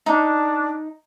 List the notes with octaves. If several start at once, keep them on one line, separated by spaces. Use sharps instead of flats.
D4 D#4